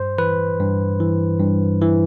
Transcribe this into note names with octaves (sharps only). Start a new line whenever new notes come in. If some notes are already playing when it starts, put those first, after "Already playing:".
Already playing: G2 C5
E3 B4
G2
E3
G2
E3